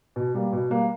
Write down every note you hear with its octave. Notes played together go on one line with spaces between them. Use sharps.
B2
G3 A#3
B2
G3 A#3